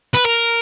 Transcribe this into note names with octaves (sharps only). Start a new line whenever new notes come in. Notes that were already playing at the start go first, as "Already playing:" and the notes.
B4
A#4